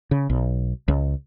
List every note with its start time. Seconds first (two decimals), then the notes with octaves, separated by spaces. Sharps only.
0.11 C#3
0.30 B1
0.88 C#2